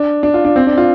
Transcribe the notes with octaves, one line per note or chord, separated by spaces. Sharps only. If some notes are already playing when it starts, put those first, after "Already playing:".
Already playing: D4
D4
F4
D4
C4
D4
F4